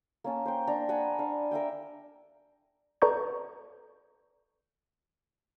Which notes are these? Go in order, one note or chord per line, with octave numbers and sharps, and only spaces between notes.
A#3 C#4 A5
C5 G5
D4 A#5
F#5 G#5 A#5 B5
D4 F5
A#4 E5 F5 G5
A4 B4 D5 A#5 C#6 G6